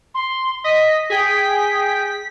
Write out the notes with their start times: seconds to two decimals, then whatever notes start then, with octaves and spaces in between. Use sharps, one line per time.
0.14 C6
0.64 D#5 B6
1.10 G#4 G5 B6